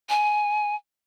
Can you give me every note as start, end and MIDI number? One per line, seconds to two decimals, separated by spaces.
0.09 0.75 80